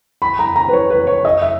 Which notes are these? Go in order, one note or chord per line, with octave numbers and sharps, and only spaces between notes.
B5
A#5
A#5
B4
C#5
B4
C#5
D#5
E5